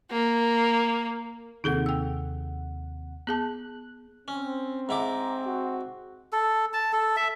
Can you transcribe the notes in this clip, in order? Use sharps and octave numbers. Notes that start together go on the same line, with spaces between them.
A#3
D#2 C3 D#4 G#4 A4 F#5
G5 E6
B3 G#4 A5 F#6
C4 C#4
G#2 E4 A#5 D6
F#4
A4
A5
A4
E5